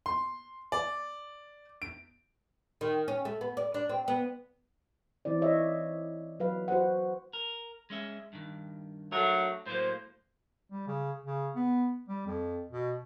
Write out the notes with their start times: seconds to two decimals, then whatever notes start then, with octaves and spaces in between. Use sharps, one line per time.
0.06 C6
0.72 D5
1.82 D7
2.81 D#3
3.08 C#4
3.25 A3
3.41 B3
3.57 D5
3.74 D4
3.89 C4
4.08 B3
5.25 E3 C4 E4 D5
5.42 C#5 D#5 E5
6.40 F#3 B4 F5
6.68 F#4 C5 F#5
7.33 A#4
7.90 G#3 C#4 E5
8.33 G2 D#3
9.12 F#3 A3 D4 A#4
9.66 A2 F#3 A#3 C5
10.71 G3
10.87 C#3
11.26 C#3
11.55 B3
12.08 G3
12.27 F2
12.71 B2